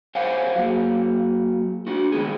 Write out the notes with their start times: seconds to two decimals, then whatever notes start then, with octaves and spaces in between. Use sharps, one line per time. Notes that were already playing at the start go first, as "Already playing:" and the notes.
0.15 G4 C5 C#5 F5 F#5 G#5
0.55 F#3 A#3
1.87 D4 F#4
2.12 D#3 G#3 B3 G#4